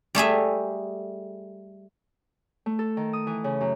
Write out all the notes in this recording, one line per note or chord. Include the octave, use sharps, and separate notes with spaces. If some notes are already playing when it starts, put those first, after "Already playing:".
G3 A3 G#4 E5
A3
A4
D#3
D#6
E3
C#3
F#2